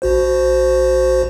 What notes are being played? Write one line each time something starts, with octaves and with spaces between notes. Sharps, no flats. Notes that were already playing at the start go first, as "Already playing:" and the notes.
A#1 F#4 C5